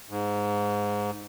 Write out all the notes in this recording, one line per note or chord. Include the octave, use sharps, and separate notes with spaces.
G#2